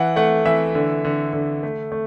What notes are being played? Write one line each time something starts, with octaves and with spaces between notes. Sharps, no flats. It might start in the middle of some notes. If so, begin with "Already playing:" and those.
Already playing: E3 F#5
A3 F#5
E3 E5
D3
D3
D3
A3
A3